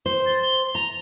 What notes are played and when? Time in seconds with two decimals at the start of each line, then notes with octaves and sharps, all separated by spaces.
0.06 C5 G7
0.26 A6
0.42 G7
0.75 A#5 F7